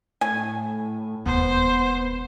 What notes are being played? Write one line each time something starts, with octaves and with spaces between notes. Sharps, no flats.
A2 G#5
E1 D#2 B3 C5